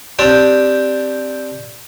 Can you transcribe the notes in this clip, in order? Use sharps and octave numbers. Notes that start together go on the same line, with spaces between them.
C4 D4 G4 A5